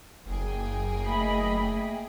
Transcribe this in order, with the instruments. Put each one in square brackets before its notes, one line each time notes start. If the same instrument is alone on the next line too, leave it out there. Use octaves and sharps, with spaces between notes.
[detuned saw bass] F#1 [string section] A#3 G#4 G5
[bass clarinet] A3 [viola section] D#5 B5